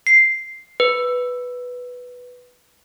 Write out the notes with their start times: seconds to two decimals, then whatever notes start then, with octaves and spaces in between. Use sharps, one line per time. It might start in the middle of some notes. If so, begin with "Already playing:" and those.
0.07 C7
0.80 B4